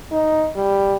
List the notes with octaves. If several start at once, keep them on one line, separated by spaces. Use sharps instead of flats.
D#4
G3